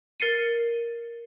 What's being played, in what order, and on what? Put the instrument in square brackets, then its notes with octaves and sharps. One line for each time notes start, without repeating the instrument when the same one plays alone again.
[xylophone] A#4 A6 C7 C#7 D#7